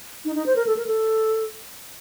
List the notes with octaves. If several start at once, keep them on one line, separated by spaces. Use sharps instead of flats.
D#4
D#4
C5
A#4
A4
A#4
A4